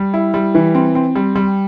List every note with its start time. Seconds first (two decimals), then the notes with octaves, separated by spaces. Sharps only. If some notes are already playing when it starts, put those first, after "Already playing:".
Already playing: G3
0.14 E4
0.34 G3
0.55 E3
0.75 C4
0.95 C4
1.16 G3
1.36 G3